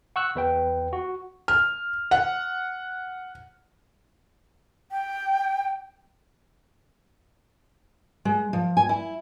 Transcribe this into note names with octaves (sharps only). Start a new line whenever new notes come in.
F#5 C#6 E6 F#6
E2 B4 G5
F#4
F6
F#5
G5
G#3
F3
G#5
E4